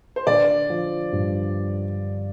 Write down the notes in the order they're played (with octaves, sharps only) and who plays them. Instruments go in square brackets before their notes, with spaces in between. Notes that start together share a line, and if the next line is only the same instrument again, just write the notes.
[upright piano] C5
[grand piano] D3 [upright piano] D5
[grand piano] F3
G2